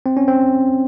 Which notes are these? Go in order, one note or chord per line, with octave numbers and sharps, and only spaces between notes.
C4
C#4
C4